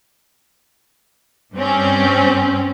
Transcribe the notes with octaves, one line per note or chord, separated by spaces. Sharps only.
G2 C4 C#4